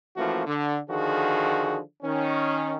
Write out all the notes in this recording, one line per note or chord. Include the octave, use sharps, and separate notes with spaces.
E3 F3 A3 A#3 C#4 F#4
D3
D3 D#3 F3 F#4 G#4
D#3 C#4